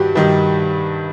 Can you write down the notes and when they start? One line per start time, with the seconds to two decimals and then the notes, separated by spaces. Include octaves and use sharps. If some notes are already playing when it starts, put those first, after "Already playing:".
Already playing: G2 D#3 G3 F#4 G4
0.15 G2 D#3 G3 G4